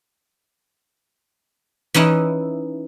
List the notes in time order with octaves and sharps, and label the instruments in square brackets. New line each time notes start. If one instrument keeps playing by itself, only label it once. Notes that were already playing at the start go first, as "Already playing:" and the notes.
[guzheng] E3 C#4 D#4 E4